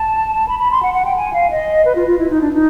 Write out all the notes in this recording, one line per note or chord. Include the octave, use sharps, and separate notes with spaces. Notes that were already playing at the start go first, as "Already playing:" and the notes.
Already playing: A5
B5
B5
C6
F#5
F#5
G5
G#5
F5
D#5
B4
F4
F4
E4
D#4
D4
D#4